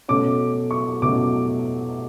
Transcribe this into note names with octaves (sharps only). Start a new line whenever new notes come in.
B2 A3 C#4 D6
C#6
B2 A3 C#4 D6